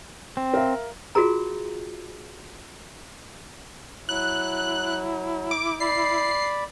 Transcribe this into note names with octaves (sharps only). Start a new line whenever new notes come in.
C4
A#4 E5 F5
F4 F#4 G#4 A#4 A#5
F#3 E4 F#6
D6
D5 B5 C7